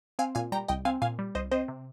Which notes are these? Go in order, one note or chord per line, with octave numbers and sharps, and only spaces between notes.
C4 F5 G#5
A#2 F5 G#5
G3 G5 A#5
C2 D#5 G5
C4 F5 G#5
A#2 F5 G#5
G3
C2 C5 D#5
C4 C5 D#5
C3